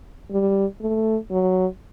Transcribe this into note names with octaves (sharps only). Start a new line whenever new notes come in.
G3
A3
F#3